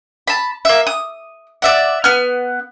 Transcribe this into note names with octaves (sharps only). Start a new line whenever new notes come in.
A5 B5
A#3 E5
D#6
D5 E5 F#5
B3 F6